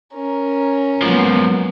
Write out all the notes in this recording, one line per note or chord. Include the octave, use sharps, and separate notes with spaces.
C#4 A#4
G#2 F3 F#3 A#3 B3